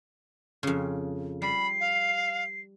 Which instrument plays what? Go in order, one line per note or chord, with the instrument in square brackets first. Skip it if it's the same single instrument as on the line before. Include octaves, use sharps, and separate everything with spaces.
[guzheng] F2 C#3
[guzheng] G3 [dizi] B5 [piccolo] C7
[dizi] F5